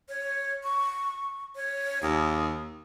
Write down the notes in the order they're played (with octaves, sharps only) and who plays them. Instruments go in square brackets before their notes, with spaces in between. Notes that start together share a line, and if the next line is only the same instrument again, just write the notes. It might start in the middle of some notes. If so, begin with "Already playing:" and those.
[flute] C#5
C#6
C#5
[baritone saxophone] D#2 [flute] D#6